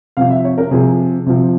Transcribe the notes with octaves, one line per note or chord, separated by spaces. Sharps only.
C3 F3 F5
E5
C#5
A#4
C3 F3 G#4
C3 F3